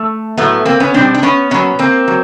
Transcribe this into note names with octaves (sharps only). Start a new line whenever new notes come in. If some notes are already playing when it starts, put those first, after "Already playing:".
Already playing: A3
A2 F#3 A3 B3
A#3 C4
B3 C#4
B2 G3 C4 D4
D4
B3 C#4
A#2 F#3 B3 C#4
A#3 C4
F#3